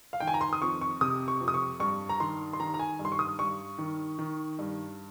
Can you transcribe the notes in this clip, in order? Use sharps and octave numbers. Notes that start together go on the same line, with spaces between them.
F5
D#3 G5
G#5
A#5
C6
D#6
F2 C#6
C#6
C3 D#6
C#6
F2
D#6
C#6
G2 C#6
A#5
D#3 C6
C6
D#3 A#5
A#5
G#5
G2
C6
C#6
D#6
G2 C#6
D#3
D#3
G2